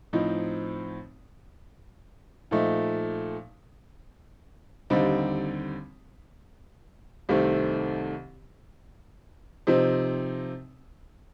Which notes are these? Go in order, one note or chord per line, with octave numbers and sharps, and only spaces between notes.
A2 F3 C4 D#4
A#2 F3 A3 D#4
D#2 D3 G3 C4 D#4
C2 C3 D#3 A3 C4
C3 F3 C4 D#4